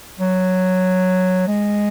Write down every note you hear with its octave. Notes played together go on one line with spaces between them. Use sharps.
F#3
G#3